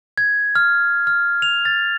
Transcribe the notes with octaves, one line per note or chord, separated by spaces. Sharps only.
G#6
F6
F6
F7
A6